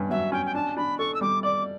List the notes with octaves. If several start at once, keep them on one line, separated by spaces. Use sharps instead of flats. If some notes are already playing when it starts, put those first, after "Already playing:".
Already playing: G2 C#4
F#3 E5
C#4 G5
G5
D4 A5
D4 B5
A4 C#6
E6
G3 D6
D5 D6